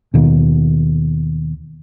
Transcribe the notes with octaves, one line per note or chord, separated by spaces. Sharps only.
D#2 B2